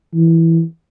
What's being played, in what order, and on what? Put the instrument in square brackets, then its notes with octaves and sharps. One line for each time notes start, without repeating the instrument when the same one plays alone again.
[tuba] E3